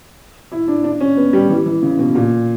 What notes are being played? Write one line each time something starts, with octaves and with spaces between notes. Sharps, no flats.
E4
D4
D4
C#4
B3
G3
E3
E3
C#3
B2
A#2